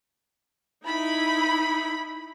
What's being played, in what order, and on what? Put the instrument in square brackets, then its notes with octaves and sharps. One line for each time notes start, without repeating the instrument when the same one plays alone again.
[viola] D#4 E4 [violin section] B5